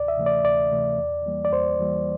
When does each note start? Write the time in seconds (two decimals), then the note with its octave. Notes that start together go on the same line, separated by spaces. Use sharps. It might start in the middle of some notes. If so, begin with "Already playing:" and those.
Already playing: D2 D5
0.08 E5
0.17 C3 E3 A3
0.26 D5
0.44 D2 D5
0.72 C3 E3 A3
0.98 E2
1.26 E3 G3 A#3
1.45 D5
1.52 E2 C5
1.80 E3 G3 A#3